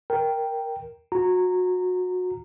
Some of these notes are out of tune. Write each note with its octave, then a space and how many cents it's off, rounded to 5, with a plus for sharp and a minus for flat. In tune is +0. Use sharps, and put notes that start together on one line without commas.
A#4 +0 G5 +0
F#4 -25 A#5 -15